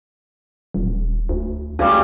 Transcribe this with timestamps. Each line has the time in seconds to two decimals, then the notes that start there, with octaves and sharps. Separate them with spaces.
0.74 D#1
1.29 D2
1.79 D2 C#3 G3